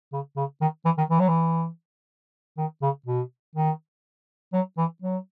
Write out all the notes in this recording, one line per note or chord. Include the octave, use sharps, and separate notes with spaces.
C#3
C#3
D#3
E3
D#3
E3
F#3
E3
D#3
C#3
B2
D#3
F#3
E3
F#3